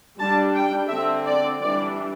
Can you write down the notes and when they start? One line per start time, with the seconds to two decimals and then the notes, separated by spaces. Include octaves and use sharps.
0.18 G3 D4 A5
0.54 G5
0.89 D3 C4 E5
1.26 D5
1.61 E3 G3 D4 D5